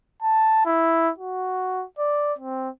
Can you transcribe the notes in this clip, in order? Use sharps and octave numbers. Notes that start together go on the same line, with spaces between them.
A5
E4
F#4
D5
C4